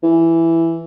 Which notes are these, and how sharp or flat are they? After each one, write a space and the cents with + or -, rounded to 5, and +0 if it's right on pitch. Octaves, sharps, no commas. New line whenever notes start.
E3 +5